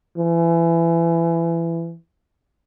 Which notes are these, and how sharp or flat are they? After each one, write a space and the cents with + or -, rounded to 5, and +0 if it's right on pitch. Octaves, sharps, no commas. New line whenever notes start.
E3 +25